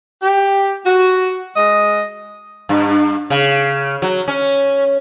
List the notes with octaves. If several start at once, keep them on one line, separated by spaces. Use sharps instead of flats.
G4
F#4
G#3 D#5
G2
C#3
F#3
C#4